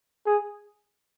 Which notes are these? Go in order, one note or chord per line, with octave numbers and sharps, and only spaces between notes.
G#4